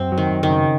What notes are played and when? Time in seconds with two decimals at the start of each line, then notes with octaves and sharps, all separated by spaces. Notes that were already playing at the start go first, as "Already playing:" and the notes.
Already playing: F#2 C4
0.12 F#3
0.18 D#3
0.31 F#2
0.43 D#3
0.50 C#3